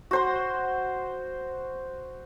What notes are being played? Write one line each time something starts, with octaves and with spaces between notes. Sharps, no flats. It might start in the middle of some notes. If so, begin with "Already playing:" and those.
F#4 C5 C6